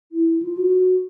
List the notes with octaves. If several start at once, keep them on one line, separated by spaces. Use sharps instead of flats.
E4
F4
F#4